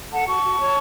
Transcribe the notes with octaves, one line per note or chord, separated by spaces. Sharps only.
A4 F#5 A5
F#4 A5 C#6
F#4
C#5